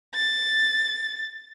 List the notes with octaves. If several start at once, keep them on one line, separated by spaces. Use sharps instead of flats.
A6